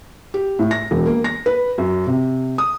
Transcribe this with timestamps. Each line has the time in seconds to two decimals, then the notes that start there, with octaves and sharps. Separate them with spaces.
0.34 G4
0.59 A2
0.71 A#6
0.91 E1
1.06 A#3
1.24 A#6
1.46 B4
1.78 F#2
2.07 C3
2.58 D#6